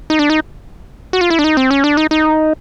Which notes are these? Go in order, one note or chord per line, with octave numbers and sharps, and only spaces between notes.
D#4
D4
D#4
F#4
F4
E4
D4
D#4
C4
C#4
D4
D#4
D#4